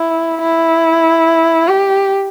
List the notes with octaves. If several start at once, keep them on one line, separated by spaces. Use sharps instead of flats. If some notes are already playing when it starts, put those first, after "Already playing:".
Already playing: E4
E4
G4